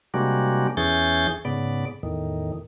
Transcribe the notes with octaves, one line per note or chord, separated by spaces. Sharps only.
C3 G3 G#3 A#3 D4 F#4
E2 E3 C#4 G#4 G6 A6
G#2 C#3 B3 D5
E2 A2 D#3